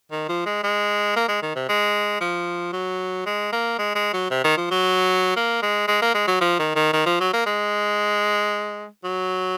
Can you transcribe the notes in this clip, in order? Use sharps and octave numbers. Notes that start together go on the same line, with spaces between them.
D#3
F3
G#3
G#3
A#3
G#3
D#3
C3
G#3
F3
F#3
G#3
A#3
G#3
G#3
F#3
C3
D#3
F3
F#3
A#3
G#3
G#3
A#3
G#3
F#3
F3
D#3
D#3
D#3
F3
F#3
A#3
G#3
F#3